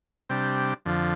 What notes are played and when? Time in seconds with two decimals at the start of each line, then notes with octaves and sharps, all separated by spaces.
0.29 C3 G3 D4
0.85 F2 D3 F3